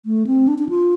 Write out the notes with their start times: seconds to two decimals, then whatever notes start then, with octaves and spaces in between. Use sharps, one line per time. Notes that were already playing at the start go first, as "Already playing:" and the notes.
0.06 A3
0.27 C4
0.48 D4
0.58 D4
0.69 F4